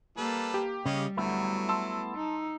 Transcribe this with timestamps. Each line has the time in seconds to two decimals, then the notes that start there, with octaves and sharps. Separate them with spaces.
0.18 G3 A#3 A4 B4
0.54 G4
0.86 C#3 G3 C#4 D#5 F5
1.17 D2 F#3 A3 B3 E4
1.69 A5 C6 E6
2.15 D#4